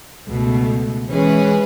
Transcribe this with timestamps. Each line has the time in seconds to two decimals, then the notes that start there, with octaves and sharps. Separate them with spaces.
0.27 C#2 B2 A3
1.06 E3 G#3 C#4 G#4 B4